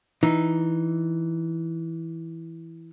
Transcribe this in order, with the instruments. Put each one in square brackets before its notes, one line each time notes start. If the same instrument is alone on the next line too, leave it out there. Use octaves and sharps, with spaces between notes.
[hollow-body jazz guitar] E3 D#4